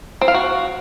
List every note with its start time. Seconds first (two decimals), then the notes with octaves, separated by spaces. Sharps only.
0.21 C4
0.28 F5
0.34 F#4